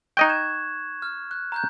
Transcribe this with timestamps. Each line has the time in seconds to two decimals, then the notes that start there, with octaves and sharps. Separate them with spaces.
0.17 D#4 D#5 G5 C#6 F#6 G#6
0.29 G#6 E7
1.02 F6
1.31 F#6
1.52 A#5 F#6 G6